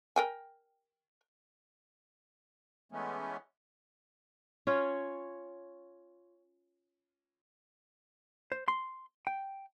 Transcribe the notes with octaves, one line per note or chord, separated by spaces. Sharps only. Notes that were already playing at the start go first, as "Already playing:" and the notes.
A#4 G5 G#5
E3 G#3 A3 B3 C#4
C#4 F4 C#5
C5
C6
G5